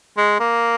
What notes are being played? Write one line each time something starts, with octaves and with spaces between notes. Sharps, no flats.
G#3
A#3